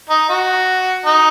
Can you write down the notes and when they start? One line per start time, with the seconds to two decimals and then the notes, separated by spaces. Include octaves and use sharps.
0.10 D#4
0.29 F#4
1.05 D#4